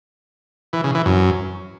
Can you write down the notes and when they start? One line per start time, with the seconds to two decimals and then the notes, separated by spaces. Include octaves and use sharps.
0.73 E3
0.84 C#3
0.95 E3
1.05 F#2